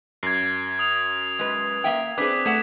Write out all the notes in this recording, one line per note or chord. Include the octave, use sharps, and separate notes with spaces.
F#2 G#6 C7
D#6 F7
G#3 B4
A#3 E5 G5
C4 D4 G#4 B4 D6 B6
A3 F#5 D6 G#6 B6 E7